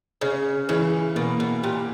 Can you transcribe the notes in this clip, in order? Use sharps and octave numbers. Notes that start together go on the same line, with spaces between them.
C#3 C#4
C#3 E3
B2 A#3
B2
A#2 G4